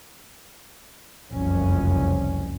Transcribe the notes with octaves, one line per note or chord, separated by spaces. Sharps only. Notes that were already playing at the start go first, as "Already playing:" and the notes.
F#1 C2 F2 C#4